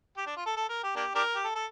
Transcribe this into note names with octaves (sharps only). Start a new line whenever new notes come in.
G4
D4
F4
A4
A4
A#4
G4
A#3 D4 G4
D4 G4 A#4
G4
A4
A4